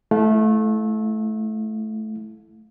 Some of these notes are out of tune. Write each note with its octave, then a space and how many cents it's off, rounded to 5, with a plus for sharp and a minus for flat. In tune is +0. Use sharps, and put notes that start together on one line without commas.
A3 -20 E4 +0 F5 +25